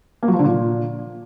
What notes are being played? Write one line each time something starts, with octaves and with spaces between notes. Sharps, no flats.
A#3
F#3
F3
D3
A#2